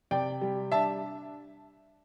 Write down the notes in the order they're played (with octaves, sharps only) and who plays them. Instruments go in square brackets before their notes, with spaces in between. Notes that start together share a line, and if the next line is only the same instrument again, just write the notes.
[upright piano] C3 D5 G5
G3
D4 E5 A5